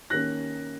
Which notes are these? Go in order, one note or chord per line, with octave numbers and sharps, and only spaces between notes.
D#3 A#3 C#4 F#6 A#6